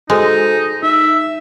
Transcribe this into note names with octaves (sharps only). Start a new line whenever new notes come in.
G#3 D#4 F#4 A4 C5
D#4 E5